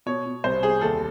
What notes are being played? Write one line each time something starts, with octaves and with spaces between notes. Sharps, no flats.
B2 C#5
B2
C2 C5
C2 G#4
D#2 A4